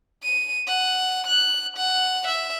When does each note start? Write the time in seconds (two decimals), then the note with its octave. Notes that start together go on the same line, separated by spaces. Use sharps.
0.23 D#7
0.67 F#5
1.27 F#6
1.77 F#5
2.27 E5